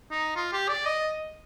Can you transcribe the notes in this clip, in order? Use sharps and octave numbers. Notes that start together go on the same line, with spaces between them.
D#4
F4
G4
D5
D#5